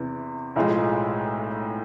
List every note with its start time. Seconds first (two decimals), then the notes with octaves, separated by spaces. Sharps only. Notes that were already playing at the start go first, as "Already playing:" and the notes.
Already playing: E2 C3 E3
0.56 B1 A2 F3 G#3